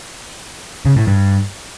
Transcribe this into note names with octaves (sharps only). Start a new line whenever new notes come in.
C#3
A2
G2